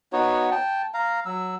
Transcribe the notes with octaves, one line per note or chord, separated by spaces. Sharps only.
B3 D#4 F#4 C#5
G5 A5
F5 A#5
F#3 E6